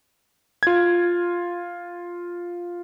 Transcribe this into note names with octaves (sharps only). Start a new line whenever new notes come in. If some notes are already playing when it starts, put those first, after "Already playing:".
F4 G#6